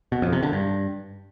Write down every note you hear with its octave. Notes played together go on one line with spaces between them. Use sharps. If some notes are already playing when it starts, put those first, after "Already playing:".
B2
F2
C3
D3
G2